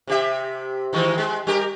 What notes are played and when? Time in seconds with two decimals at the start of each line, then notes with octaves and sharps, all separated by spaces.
0.07 C3 G4 E5
0.93 D#3 E3 G#3
1.18 G#3
1.47 G3 G4 A#4